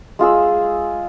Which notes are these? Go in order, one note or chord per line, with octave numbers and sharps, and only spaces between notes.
G#3 F4 G#4 E6